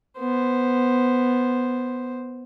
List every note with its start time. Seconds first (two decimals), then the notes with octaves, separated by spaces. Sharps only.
0.19 B3 C5